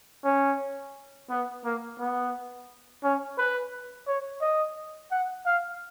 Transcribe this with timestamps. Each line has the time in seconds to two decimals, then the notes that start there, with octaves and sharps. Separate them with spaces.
0.24 C#4
1.30 B3
1.64 A#3
1.99 B3
3.03 C#4
3.38 B4
4.07 C#5
4.41 D#5
5.11 F#5
5.46 F5